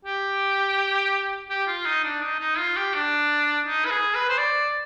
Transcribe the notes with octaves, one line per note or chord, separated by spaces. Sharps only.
G4
G4
F4
D#4
D4
D#4
D#4
F4
G4
D4
D#4
B4
G#4
B4
C5
D5